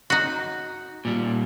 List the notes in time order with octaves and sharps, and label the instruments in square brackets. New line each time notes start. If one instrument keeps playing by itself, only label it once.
[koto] D#4 F#4
[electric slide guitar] A#2 G3